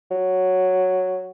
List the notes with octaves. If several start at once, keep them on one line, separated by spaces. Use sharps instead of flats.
F#3